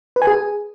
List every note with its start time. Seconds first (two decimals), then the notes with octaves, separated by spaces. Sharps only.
0.16 B4
0.22 G#5
0.27 G#4